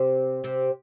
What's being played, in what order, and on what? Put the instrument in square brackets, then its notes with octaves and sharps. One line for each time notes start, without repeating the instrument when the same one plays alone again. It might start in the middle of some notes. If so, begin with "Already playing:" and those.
Already playing: [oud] C3 C4
C3 C4